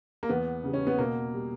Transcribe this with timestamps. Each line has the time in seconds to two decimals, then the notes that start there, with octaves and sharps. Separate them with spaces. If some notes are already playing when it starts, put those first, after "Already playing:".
0.23 A#3
0.29 E2 B3
0.64 C#3 G3
0.74 C#4
0.87 B3
0.99 B2 A#3
1.34 G3